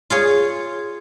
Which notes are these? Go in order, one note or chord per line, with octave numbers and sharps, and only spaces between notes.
F4 G#4 C#5